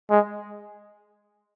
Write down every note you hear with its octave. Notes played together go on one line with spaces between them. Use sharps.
G#3